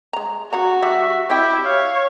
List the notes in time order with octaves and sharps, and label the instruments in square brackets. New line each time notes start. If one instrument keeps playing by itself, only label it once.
[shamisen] G#3 A#5
[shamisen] C#3 F#5 A#5 [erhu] F#4
[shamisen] G3 [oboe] E5
[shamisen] C4 D#5 G5 [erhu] E4 [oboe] G4
[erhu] C#5 [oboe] F5